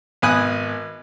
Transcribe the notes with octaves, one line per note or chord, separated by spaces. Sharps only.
G#1 B3 B4 G#5 D#6 F#6